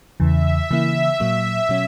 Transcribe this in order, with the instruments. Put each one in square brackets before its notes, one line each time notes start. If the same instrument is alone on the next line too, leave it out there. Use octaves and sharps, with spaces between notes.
[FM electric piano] E2 C#3 E3 [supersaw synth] E5
[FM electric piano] C#3 E3 A#3 E4
A#2 F#3 A#3
B2 F#3 C#4